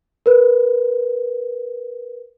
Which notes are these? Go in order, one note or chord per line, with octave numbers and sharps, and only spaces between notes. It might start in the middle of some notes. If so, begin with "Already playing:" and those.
A#4 B4